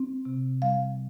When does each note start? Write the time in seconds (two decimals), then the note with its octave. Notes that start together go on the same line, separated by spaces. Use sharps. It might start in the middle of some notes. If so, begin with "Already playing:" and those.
Already playing: C4
0.25 C3
0.62 G3 F5